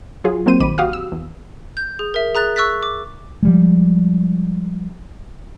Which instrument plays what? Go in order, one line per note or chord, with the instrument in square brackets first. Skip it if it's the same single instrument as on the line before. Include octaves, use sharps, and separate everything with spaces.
[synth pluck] F#3 F4 G#4
F#3 A#3 C4 C5 D#7
A#1 D#3 B5 D6 D#7
F#4 G4 F5 D#6 F6
E6
E2
[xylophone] G6
G#4
A#4 E5
G#4 A#5 F#6 A6
C#6 E6 F#6 A6 B6
D6
[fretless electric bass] F3 G3 G#3